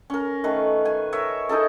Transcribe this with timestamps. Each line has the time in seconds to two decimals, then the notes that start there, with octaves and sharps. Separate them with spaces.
0.10 C#4 A#4
0.44 D#3 A3 B4
0.85 G#5
1.12 A#4 C#5 E5
1.49 D#4 E4 G#4 A4